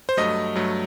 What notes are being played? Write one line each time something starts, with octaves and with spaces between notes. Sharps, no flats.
C5
G2 F#3 A3 D#5
G2 F#3 A3